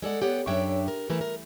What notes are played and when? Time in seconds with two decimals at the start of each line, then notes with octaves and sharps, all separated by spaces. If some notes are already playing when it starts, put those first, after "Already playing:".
0.02 G#3 A4 D5 F#5
0.21 B3 G4 C#5 F#5
0.47 F#2 D4 G4 C#5 E5 G5
0.88 A#4
1.10 E3 A3 A#4 B4
1.21 A#4